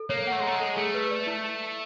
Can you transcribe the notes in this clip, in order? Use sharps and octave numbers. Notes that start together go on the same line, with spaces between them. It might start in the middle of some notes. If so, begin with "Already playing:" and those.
Already playing: A4
A#3 C#5
A3 F#5
G#3
A3 A#5
G#3
A4
A3 G#4
B4
D5
E4